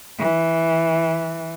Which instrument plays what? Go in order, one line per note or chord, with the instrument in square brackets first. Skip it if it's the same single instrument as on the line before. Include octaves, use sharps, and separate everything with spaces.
[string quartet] E3